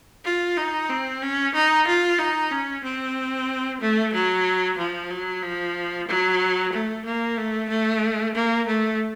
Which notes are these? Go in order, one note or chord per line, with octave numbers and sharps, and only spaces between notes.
F4
D#4
C4
C#4
D#4
F4
D#4
C#4
C4
A3
F#3
F3
F#3
F3
F#3
A3
A#3
A3
A3
A#3
A3